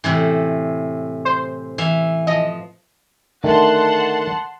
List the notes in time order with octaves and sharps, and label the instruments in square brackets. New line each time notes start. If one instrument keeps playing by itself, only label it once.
[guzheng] A2 C3 E3
[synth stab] C5
[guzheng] E3 E5 F5
[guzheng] F3 [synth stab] D#5
[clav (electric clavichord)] D3 D#3 A3 [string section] F#5 A5 C6